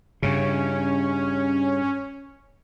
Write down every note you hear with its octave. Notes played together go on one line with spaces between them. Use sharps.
G2 C#3 C#4